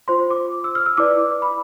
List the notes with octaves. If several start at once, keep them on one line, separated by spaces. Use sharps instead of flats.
F4 C5 C6
D6
E6
F6
E6
E4 B4 D5 D6
B5